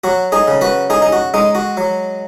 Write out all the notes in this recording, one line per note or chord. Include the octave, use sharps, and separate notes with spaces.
F#3 F#4
D#4 G#4
C#3
F#4 B4
D#4 G#4
D#4
F#4
G#3 D#4
F#4
F#3